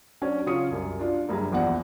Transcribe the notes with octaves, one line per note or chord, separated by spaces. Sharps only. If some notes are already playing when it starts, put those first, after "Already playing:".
F#3 C#4 D4
C#3 F#3 C#4 F4 D#6 C#7
C2 F#2
D4 F4
F#1 G2 G#4 A#5
A#1 E2 D5 F#5